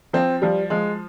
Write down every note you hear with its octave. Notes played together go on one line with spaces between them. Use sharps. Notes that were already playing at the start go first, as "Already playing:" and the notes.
F3 C4
F3 G3
F3 G#3